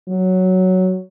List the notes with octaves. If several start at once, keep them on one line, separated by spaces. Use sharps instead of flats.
F#3